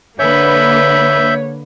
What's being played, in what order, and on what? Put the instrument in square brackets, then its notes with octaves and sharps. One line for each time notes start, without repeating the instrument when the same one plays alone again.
[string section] D3 A#3 B4 [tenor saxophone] C#5 [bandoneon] E5 G6